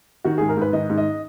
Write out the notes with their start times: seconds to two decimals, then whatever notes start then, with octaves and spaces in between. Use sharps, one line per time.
0.24 D#3 F#4
0.38 G#2 G#4
0.49 A#4
0.57 G#2 B4
0.73 D#3 D#5
0.90 G#2
0.98 D#5